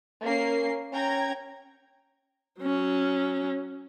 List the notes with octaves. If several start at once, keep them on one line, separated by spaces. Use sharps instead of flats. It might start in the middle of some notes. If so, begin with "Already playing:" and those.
A#3 C#4 A#4 C7
C#4 G5 A#5 G#6
F#3 C#4